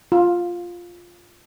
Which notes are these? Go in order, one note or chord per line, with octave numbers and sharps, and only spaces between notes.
F4